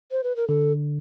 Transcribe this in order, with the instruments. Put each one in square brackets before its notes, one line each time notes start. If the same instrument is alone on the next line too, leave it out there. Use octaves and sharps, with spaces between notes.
[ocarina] C5
B4
A#4
[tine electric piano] D3 [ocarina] A4